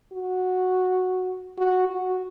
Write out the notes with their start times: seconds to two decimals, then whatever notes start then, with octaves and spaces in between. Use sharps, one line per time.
0.13 F#4
1.58 F#4
1.87 F#4